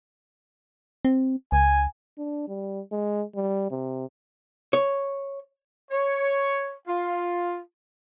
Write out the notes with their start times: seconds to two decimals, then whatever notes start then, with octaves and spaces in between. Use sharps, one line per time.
1.05 C4
1.52 C#2 G#5
2.18 D4
2.48 G3
2.92 G#3
3.35 G3
3.71 C3
4.73 C#5
5.91 C#5
6.88 F4